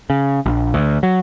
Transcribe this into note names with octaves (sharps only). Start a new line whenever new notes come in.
C#3
A#1
D2
F#3